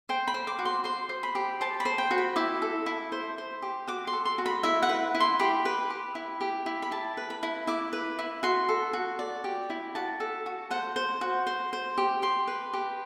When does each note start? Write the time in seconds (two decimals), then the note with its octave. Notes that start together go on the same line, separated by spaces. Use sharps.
0.09 C5 G5
0.28 B5
0.34 C5
0.47 D6
0.59 F#4
0.65 C6
0.84 C5 C6
1.09 C5
1.23 B5
1.35 G4
1.61 C5 A5
1.80 B5
1.85 C5
1.98 G5
2.11 F#4
2.18 B5
2.36 E4 D6
2.62 A4
2.86 E4
3.12 C5
3.38 C5
3.62 G4
3.87 F#4 D6
4.07 C6
4.13 A4
4.25 C6
4.38 F#4
4.46 B5
4.63 E4 E5
4.82 F#5
4.89 B4
5.15 E4
5.20 C6
5.40 G4 B5
5.65 B4
5.90 G4
6.15 E4
6.41 G4
6.66 E4
6.82 B5
6.91 E4 A5
7.17 B4
7.30 B5
7.43 E4
7.67 E4 D6
7.93 B4
8.19 E4
8.43 F#4 C6
8.69 A4
8.93 F#4
9.19 D5
9.44 G4
9.70 E4
9.95 F#4 A5
10.20 A4
10.46 F#4
10.71 C5 F#5
10.96 C5
11.21 F#4
11.47 C5
11.73 C5
11.98 G4
12.22 G4 C6
12.47 B4
12.73 G4